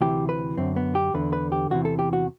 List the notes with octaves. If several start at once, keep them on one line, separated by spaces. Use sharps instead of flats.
D2 C3 E3 G4
B4
F#2 D3 C4
B3
G4
E2 D3 B4
B4
G4
E2 C3 E3 F#4
A4
G4
F#4